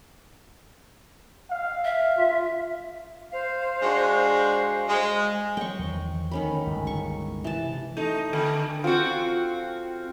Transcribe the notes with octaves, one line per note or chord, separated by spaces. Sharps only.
F5
E5
F4
C5 F5
G#3 D4 F#4
G#3
F#3 G3 G5 C#6
E2 D#3 F3
D2 D#3 C#4 B5
G1 C#2 A2
C#6
C3 E3 A5
A3 D#4
D3 A4 G#5
C4 F4 F#4